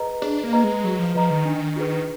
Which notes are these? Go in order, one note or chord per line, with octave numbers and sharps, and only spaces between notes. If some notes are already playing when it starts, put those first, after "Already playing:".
Already playing: G#4 B4 D#5 A#5
D4 G#4
A#3
B4 D#5 A#5
G#3
F#3 G#4
F3
F3 B4 D#5 A#5
D#3
D4
F4 G#4 B4